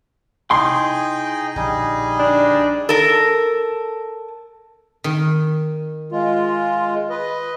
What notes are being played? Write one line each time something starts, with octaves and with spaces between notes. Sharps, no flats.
C3 D#4 E4 G#4 G5 C6
A#1 D3 G3 D#4 G#4
D4
A4 A#4
D#3
G#3 F4
B4 D#5